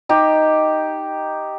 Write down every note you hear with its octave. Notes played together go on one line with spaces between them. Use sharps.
D#4 G4